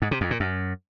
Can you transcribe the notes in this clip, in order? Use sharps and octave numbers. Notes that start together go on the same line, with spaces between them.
G#2
C3
F2
A#2
F#2